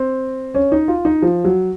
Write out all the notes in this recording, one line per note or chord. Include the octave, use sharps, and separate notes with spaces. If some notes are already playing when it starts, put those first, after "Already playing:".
Already playing: C4
C#4
D#4
F4
D#4
F3
F#3